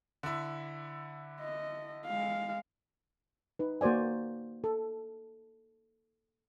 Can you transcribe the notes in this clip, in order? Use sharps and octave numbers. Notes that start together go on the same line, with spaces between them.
D3 E4
D#5
G#3 F5
D#4 B4
A#3 F#4 C5 D5 G#5
A4